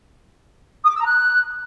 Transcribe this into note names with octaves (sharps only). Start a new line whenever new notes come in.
D#6
D6
E6
A#5
F#6